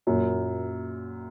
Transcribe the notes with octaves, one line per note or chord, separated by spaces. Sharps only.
F#2 A#2